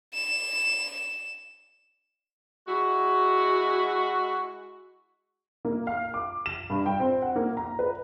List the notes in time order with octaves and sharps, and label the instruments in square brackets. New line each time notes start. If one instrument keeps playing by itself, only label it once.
[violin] E7
[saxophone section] G#3 E4 F#4
[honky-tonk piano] A#3
F5
D6
E7
G2
G5
C4
F#5
A#3
A#5
B4